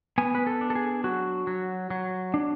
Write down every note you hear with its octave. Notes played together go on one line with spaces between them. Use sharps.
B3 G#5
B4
A4
D4
A4
G#4
F#3 F#4
F#3
F#3
D4